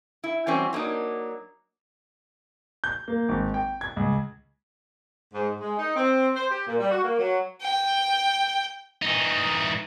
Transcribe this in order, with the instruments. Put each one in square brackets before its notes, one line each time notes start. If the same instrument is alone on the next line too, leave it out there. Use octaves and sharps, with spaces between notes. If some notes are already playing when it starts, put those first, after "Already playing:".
[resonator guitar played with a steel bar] E4
E3 F#3 G3 C4 C#4
F#3 A#3 D4 D#4
[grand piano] G6
A#3
G#1
G5
G#6
C#2
[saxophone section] G#2
G#3
D#4
C4
C5
G4
A#2
G3
F#4
A#3
F#3
[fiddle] G5
[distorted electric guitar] E3 D#4